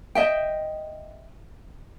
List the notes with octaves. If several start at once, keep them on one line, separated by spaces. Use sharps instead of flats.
D#5 E5 G5